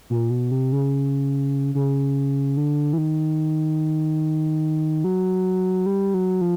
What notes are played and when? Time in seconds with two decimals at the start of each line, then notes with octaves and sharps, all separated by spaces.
0.10 A#2
0.30 B2
0.51 C3
0.72 C#3
1.75 C#3
2.57 D3
2.93 E3
2.98 D#3
5.04 F#3
5.86 G3
6.14 F#3
6.41 F3